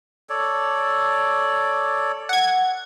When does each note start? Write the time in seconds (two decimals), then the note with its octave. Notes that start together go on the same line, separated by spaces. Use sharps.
0.29 A4 C#5 D5
2.29 F#5 G#6